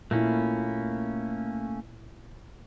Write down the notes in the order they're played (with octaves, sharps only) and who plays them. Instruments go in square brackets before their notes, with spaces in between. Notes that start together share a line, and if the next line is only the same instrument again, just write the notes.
[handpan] A#2 E4 [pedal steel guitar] A3 A#3 C#4